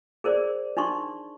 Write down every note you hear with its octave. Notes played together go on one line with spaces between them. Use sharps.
G#4 A#4 C5 D5
D4 D#4 C6 C#6